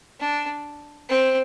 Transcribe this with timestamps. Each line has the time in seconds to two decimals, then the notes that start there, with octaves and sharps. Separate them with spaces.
0.20 D4
1.09 C4